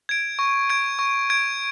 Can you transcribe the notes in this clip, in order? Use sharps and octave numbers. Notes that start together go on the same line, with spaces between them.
G#6 D7
C#6
G#6 D7
C#6
G#6 D7